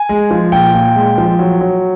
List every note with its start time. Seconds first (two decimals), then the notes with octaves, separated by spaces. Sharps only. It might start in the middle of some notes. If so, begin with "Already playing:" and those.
Already playing: G#5
0.09 G#3
0.31 F3
0.52 A#2 G5
0.74 A#2
0.96 G#3
1.18 F3
1.39 F#3
1.61 F#3